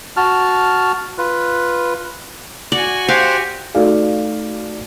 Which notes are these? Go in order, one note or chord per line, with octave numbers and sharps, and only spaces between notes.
F#4 A5 F6
F4 B4
F#4 D5 G#5
G4 C5 F5 F#5
A3 D#4 F#4 A4 D5 F5